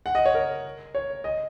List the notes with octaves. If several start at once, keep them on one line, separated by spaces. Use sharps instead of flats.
F#5
D#5
C#5
A#4
C#5
D#5